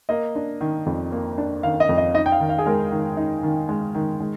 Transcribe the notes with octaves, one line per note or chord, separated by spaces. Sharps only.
A#3 D#5
D4
D#3
F2
A#3
D4
D#3 F5
D#5
F2
D#5
D#4 D#5
G5
F5
D#3
F5
G#4
G#3 A#4
D#3
D#4
D#3
G#3
D#3
G#3